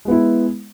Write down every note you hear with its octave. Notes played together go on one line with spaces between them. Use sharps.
G#3 B3 E4